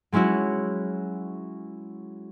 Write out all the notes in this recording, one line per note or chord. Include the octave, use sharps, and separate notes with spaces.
F#3 G#3 C#4 E4 F#4